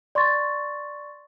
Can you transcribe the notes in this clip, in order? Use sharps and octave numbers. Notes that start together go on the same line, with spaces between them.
D5 C6 C#6 A6